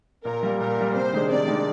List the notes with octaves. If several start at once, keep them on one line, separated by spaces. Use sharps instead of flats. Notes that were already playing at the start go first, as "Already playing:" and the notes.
A#2 A#4
G3 A#3
A#2 A#4
G3 A#3
C3 C5
D#3 G#3 D4
C3 D5
D#3 G#3 D4